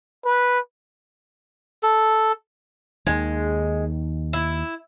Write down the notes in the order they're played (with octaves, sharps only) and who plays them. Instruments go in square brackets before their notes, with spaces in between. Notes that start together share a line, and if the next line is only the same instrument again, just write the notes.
[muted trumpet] B4
[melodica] A4
[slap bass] D#2 D#3 [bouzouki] G#3
[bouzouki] E4